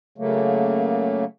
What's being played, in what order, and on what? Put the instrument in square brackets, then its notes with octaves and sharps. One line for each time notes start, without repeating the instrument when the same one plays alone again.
[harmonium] C#3 F#3 A3 A#3